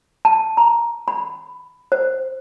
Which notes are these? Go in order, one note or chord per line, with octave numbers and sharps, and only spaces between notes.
A5
A#5
B5
C5